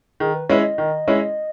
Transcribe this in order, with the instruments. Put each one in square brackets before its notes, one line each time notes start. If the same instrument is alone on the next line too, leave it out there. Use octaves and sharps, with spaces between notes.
[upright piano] D#3 [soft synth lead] G#4
[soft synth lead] B4
[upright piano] G#3 C#4 E4 [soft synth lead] B4
[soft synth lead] C#5
D#5
[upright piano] D#3
G#3 C#4 E4